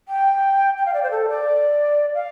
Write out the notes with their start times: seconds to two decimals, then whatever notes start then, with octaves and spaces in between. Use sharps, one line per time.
0.08 G5
0.78 G5
0.86 F5
0.94 D5
1.03 C5
1.11 A4
1.29 D5
2.15 F5